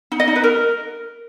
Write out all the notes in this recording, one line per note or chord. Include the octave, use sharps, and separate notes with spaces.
D#4
D#5
D#4
B4
A#4